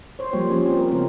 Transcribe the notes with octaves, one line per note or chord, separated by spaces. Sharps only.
C5 C#5
F3 G3 A#3 G4 C#5
F3 C#4 G#4
C4
A#4
C#3 G#3 B3 C4 E4 A#4